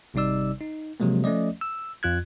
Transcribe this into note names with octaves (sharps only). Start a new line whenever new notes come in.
G#1 C3 G3 D#4 D5 E6
D#4
C3 F3 F#3 G#3 A#3
F3 A3 C#4 D5 D#5
E6
F2 F4 F#6 G#6